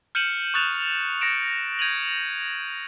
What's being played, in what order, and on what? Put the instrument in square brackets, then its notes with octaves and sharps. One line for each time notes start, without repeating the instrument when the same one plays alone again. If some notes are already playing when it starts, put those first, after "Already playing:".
[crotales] F6 G6 C#7 D#7 E7 F#7
C#6 D#6 F#6 A6 E7 F7
C#6 A#6 C#7 D7 E7
G6 G#6 D#7 F7 F#7